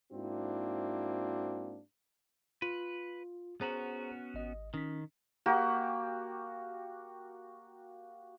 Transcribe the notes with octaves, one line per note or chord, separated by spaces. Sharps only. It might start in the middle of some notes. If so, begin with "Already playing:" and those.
G#2 A#3 C4 D4 E4 F#4
F4 B4
B3 C#4 F#4 G#4 C5 A#5
G#1 D#5
D#3 C#4 B6
A#3 F#4 G4 A#5